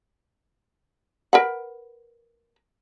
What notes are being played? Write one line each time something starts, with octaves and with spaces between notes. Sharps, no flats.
A#4 B4 F#5